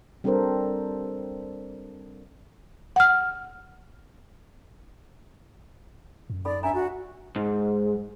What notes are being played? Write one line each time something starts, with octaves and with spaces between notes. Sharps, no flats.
G3 C4 D4 A4 A#4 C5
F#5 F6
F#2
D#4 A4 D5 B5
D4 E5 G#5 A#5
F#4
G#2